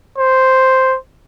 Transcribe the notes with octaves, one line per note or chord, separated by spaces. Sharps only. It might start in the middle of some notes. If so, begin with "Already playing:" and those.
C5